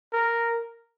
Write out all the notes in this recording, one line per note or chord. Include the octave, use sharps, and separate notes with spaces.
A#4